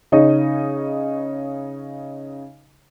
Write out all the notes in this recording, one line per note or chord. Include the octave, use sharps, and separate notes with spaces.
C#3 D#4 C#5 D#5